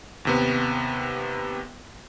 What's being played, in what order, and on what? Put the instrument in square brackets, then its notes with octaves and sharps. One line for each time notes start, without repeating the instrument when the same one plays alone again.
[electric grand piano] D#2 C3 B3